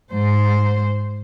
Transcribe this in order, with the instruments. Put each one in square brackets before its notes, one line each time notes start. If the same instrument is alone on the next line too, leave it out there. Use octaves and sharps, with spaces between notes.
[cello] G#2 C5